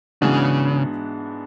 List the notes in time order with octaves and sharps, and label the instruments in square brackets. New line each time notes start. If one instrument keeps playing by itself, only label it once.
[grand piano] G#2 E3 B3 D4 F#4 [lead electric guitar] C#3